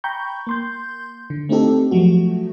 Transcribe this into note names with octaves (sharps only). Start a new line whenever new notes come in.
G5 A#5 B5 C#6 G6
A#3 C6 G6
D3
A3 C4 D4 D#4 G4 A4
F3 F#3 A3 F#4